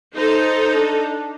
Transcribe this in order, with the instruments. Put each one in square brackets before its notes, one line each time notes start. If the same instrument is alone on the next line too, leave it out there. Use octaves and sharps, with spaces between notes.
[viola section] D#4 A4 [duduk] C5
[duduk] D4